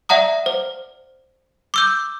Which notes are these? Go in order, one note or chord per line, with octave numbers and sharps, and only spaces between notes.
D5 E5 F#5 A#5 D#6
C5
D6 E6 G6